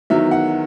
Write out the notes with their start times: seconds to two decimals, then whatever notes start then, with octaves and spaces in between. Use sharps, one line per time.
0.10 E2 D#3 F#3 E5
0.31 F#5